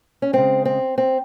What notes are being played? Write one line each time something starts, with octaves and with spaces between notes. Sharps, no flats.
C#4
C#3 G#3 C4
C4
C4